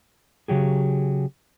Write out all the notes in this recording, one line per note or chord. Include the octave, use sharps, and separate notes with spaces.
C#3 F#3 G4 G#4